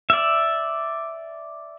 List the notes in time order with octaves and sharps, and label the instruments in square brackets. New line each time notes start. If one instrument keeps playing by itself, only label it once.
[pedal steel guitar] D5 E5